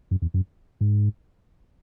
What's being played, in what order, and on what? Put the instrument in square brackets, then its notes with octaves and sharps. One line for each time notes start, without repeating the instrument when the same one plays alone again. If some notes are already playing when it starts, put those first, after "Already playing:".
[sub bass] F#2
E2
F#2
G#2